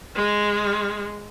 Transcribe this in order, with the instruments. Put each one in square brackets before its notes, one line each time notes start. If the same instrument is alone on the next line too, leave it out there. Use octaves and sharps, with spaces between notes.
[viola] G#3